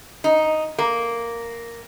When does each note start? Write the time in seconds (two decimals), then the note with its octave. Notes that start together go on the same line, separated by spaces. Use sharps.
0.24 D#4
0.79 A#3